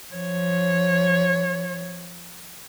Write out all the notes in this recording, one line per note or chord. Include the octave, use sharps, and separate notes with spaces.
F3 C#5